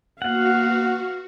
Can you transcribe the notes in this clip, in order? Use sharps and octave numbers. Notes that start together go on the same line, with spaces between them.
A#3 B3 F#4 F5 F#5